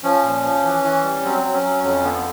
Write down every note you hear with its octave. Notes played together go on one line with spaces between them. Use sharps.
F3 C#4
A#2
F3
E3
E3
G3
F#3 C4
F#3
C#4
F#3
F2 C#4
D3 B3
B3